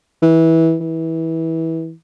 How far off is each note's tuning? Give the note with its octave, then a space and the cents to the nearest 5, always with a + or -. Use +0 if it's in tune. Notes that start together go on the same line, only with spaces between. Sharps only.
E3 -20
E3 -20